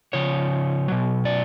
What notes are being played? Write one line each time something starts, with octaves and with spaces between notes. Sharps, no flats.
C#3 F3 C#5
B2 F#3
D5